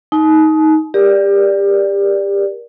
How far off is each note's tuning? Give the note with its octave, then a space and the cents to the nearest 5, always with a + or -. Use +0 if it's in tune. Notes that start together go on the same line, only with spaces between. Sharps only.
D#4 +15 A5 -45
G4 +25 A#4 +25 D5 +0